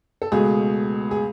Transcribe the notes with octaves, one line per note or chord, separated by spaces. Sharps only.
A4
C#2 B2 A3 G#4
G#4